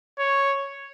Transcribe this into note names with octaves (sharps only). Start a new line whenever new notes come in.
C#5